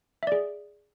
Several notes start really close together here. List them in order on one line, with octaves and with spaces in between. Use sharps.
E5 D5 G#4